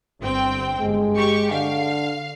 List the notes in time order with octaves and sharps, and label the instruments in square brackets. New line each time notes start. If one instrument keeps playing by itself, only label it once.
[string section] G1 C4 G5
[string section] G1 [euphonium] G#3
[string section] G4 C#6
[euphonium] D3 [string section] F5